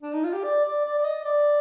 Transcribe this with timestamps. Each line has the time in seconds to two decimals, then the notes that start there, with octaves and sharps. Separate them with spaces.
0.03 D4
0.13 D#4
0.24 F4
0.33 G4
0.44 D5
0.65 D5
0.85 D5
0.98 D5
1.04 D#5
1.25 D5